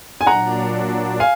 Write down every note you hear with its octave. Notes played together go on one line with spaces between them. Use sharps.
G#5
A#2 F#3 D4 F#5 A#5
F5 G#5